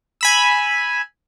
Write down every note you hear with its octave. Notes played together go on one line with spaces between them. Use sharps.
G#5 B5 E6